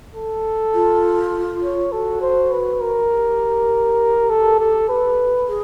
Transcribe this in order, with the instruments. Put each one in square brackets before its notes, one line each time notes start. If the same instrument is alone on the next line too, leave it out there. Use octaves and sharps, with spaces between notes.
[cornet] A4
[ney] F4
[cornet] C#5
[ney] F#4 [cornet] A4
[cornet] C5
B4
A#4
[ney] G4
[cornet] A4
A4
B4
[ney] G#4